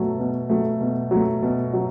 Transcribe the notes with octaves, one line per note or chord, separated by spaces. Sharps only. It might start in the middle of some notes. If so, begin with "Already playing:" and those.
Already playing: B2 F#3 A3
B2
F#3 A3
B2
F#3 A3
B2
F#3